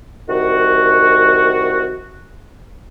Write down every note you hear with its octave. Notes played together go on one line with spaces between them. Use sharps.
C2 D#3 F#4